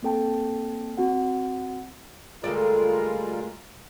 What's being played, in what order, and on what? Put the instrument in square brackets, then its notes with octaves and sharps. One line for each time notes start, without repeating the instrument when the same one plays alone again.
[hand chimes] A#3 C4 A4 G5 A5
C4 F#4 F#5
[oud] D2 A4 D5 [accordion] G3 F4 [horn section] G#3 A#4